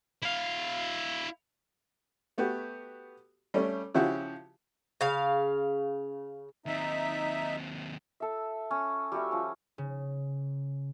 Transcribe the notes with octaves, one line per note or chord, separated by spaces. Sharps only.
E4 F5
A3 B3 F#4 G4
G3 A3 C#4
C#3 F3 E4 F#4 G4
C#3 F5
D#2 C4 D#4 E5
A4 E5
C#4
G3 F#4 E5
F3 C#4
C#3